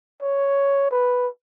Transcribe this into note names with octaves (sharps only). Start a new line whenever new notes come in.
C#5
B4